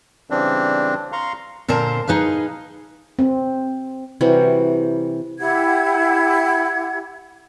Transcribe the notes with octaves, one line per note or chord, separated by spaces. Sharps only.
C#3 E3 G3 C4 D4
F5 A#5 C6 C#6
A#2 D3 A#4 C5 A5
D#4 G#4 B4 F5
C4
C3 E3 G3 F#4
E4 G4 F#5 G#6